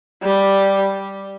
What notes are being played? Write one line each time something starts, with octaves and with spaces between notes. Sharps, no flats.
G3